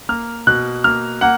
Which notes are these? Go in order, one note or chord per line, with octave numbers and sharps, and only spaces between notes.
A#3 F6
B2 F#6
A#3 F6
A#3 F#5